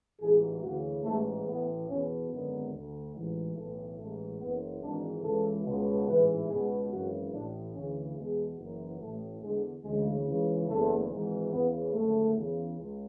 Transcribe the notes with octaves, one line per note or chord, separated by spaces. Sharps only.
A1 G#2 E3 G#4
D2 C#3 E3 F#4
A1 G#2 E3 A3
A1 A2 E3 B3
E2 B2 C#4
G#1 F#2 D3 B3
D2 D3
A1 G#2 E3
B1 A2 E3 A3
A1 G#2 E3 A3
F#1 F#2 E3 B3
G#1 G#2 E3 D4
C#2 C#3 E3 A4
C#2 B2
A1 G#2 E3 B4
C#2 B2 G#4
G#1 F#2 C#3 E3 F#4
A1 A2 E3 D4
D2 C#3 E3 C#4
E2 B2 G#3
F#1 F#2 E3
A1 A2 E3 A3
E2 D3 G#3
D2 C#3 E3 G#3
C#2 C#3 E3
F#1 E2 C#3 A3
G#1 G#2 E3
E2 C#3 E3 B3
G#1 F#2 D3 A3
E2 C#3 E3
C#2